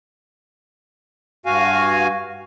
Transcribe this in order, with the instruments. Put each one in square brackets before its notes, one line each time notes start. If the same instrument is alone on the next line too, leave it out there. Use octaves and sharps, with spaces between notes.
[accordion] G2 F#4 F5 G#5